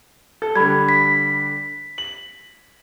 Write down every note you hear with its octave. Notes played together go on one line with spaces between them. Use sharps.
A4
D3 G3 B5 G#6
B6
F#7